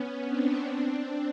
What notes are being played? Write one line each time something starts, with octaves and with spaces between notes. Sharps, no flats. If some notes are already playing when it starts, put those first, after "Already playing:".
Already playing: B3 C#4
C4 D4
C4 D4